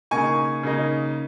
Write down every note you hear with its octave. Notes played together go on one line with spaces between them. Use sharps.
C#3 A#3 D#4 G#5 C#6
C#3 A#3 D#4